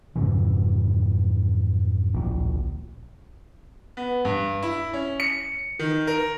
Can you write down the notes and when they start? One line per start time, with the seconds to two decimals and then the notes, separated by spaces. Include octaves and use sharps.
0.16 F2 G#2 C#3 E3
2.14 D1 A#1
3.97 B3
4.25 G2
4.62 E4
4.93 C#4
5.20 C#7
5.79 D#3
6.07 A#4